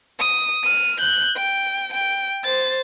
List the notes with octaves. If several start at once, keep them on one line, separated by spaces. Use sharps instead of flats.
D#6
F6 D#7
F#6 G6
G5
G5
C5 A6